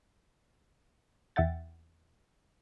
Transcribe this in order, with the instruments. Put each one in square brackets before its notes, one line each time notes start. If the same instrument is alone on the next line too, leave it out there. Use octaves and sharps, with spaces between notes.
[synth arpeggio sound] E2 E5 F#5 G5 A6